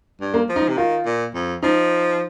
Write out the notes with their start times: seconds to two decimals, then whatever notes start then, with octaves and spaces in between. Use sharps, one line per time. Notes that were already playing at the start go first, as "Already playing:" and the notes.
0.21 G2
0.34 A#3
0.49 F3
0.56 D#4
0.69 C3
0.77 D#3 F4
1.06 A#2
1.35 F2
1.63 F3 D#4